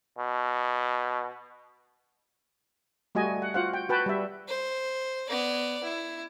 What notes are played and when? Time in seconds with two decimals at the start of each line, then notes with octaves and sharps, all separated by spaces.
0.18 B2
3.15 G3 A3 F#4 D#5 G#5
3.42 F#5
3.54 F4 F#4 C5 F5 F#5
3.73 G5
3.89 F#4 B4 G5 A5
4.06 G3 E5
4.48 C5
5.29 B3 D5
5.83 E4